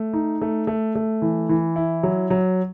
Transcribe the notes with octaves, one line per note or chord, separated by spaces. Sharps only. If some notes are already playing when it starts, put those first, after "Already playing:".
Already playing: A3
D#4
A3
A3
A3
E3
E3
E4
F#3
F#3